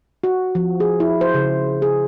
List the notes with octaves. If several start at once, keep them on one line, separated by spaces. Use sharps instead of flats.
F#4
F3
G#4
E4
C5
C#3
G#4